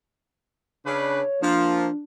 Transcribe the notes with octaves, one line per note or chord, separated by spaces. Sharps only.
C#3 D4 B4 C#5
F3 A#3 D4